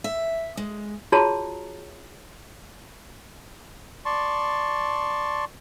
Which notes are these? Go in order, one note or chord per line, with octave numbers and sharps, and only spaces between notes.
E5
G#3
F4 F#4 G#4 C#5 A5 A#5
D5 A5 C6 C#6